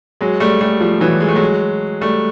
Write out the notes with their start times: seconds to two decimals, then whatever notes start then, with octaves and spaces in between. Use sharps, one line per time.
0.21 F#3 G#3
0.40 G3 A3
0.61 G3 A3
0.80 F3 G3
1.00 E3 F#3
1.20 G#3
1.28 A3
1.36 F#3 G#3
2.01 G3 A3